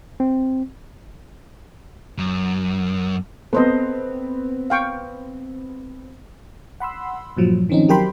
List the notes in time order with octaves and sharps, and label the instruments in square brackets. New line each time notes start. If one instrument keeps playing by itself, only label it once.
[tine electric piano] C4
[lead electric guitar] F#2
[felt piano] B3 C4 [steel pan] A4 C5 D#5
[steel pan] F5 G5 C#6
[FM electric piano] F#5 B5 C6 E6
G2 A#2 F3 F#3
D#3 F3 C4 C#4 D#4
F#3 G4 A#4 G5 B5 C6